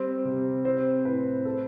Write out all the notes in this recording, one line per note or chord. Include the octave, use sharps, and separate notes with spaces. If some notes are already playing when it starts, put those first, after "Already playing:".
Already playing: G3 C4
C3
C4 C5
A2 B4
A4